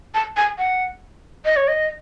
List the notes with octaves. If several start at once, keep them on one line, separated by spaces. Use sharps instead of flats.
A5
G#5
F#5
D#5
C#5
D#5